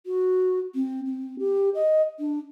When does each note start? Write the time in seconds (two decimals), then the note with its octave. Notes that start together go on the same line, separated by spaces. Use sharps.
0.06 F#4
0.75 C4
1.06 C4
1.39 G4
1.74 D#5
2.19 D4